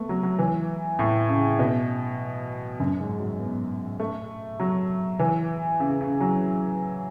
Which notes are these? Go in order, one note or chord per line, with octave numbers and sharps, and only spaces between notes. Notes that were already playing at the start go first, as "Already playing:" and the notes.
Already playing: A3 B3
F#3
F#3
E3
A2
C#3
B2
F#2
G#2
F#3
B3
A3
F#3
E3
C#3
C#3
F#3